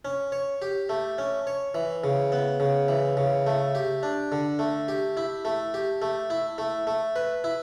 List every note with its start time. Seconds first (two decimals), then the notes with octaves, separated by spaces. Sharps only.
0.05 C#4
0.32 C#5
0.62 G4
0.89 A3
1.18 C#4
1.47 C#5
1.75 E3
2.04 C#3
2.32 B3
2.60 C#3
2.88 E3
3.17 C#3
3.46 A3
3.75 G4
4.03 D4
4.32 D3
4.59 A3
4.88 G4
5.17 E4
5.45 A3
5.74 G4
6.02 A3
6.30 E4
6.58 A3
6.87 A3
7.16 B4
7.44 E4